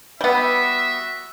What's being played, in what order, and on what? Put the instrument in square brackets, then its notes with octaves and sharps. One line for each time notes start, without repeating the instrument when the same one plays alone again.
[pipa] G3 B3 [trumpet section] F#4 E5